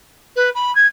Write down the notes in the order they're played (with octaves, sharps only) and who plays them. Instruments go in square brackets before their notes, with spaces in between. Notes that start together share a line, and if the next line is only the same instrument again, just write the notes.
[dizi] B4
B5
G#6